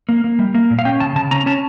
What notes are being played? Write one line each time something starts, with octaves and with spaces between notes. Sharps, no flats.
A#3
A#3
G3
A#3
A#2
F5
C#4 G5
C#3 A5
C#3 A5
C#4 A#5
C#4 A5